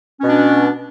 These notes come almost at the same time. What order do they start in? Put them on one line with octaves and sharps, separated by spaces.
C#4 B2 D4